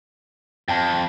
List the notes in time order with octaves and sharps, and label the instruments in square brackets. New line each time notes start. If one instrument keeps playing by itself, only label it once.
[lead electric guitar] F2 [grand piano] G5 A5